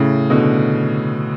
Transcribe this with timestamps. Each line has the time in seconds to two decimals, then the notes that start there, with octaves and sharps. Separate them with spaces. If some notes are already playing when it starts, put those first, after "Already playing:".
Already playing: A2 C#3
0.30 B2 D3